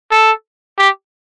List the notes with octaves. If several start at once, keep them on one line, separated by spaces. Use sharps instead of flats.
A4
G4